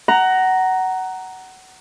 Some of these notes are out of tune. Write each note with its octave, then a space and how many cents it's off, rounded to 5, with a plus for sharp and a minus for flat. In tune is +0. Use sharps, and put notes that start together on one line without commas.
F#5 +20 A#5 +0